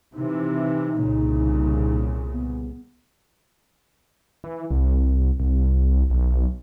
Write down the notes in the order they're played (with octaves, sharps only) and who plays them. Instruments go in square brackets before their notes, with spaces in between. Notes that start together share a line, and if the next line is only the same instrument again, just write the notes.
[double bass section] C3 E3 [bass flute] D#4
[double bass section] C2 A#2 C#3
[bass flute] B3
[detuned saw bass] E3
C2
C2
B1